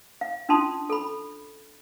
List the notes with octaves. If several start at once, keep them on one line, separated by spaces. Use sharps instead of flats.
F5
C#4 D4 F4 A5 C6 D#6
A4 B5